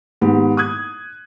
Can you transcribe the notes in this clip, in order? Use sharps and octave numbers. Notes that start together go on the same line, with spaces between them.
G#2 D#3 B3 G4
D#6 F#6 G#6